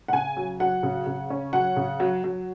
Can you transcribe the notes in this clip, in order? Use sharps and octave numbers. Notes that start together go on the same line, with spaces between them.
F#5
C#3 G#5
F#3
F#3 F#5
C#3
C#3
C#4
F#3 F#5
C#3
F#3
F#3